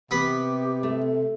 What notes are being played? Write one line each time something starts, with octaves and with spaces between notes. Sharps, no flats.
C3 B3 G4 B5
A3